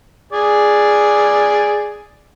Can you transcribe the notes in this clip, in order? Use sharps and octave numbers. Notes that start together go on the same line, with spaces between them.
G#4 D5